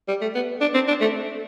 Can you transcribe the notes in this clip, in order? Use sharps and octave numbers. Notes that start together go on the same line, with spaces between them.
G3
A3
B3
D4
C4
D4
A3